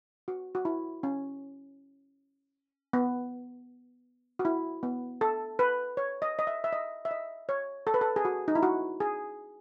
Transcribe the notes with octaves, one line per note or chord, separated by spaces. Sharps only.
F#4
F#4
E4
C#4
B3
F#4
E4
B3
A4
B4
C#5
D#5
D#5
E5
E5
D#5
E5
D#5
C#5
A4
B4
A4
G#4
F#4
D#4
E4
F#4
G#4